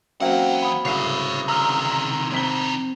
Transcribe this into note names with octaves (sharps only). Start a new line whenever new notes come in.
E2 F#3 A#3 C4 C#4 E5 F#5 G5
B5 D#6
D1 C2 C#3 C#5 E5 C7
C3 D#3 A#5 E6 F6
F2 C4 B6 G7